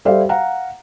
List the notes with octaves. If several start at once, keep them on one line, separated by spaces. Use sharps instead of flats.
G3 A4 C5 D5 E5 F5
F5 F#5 A#5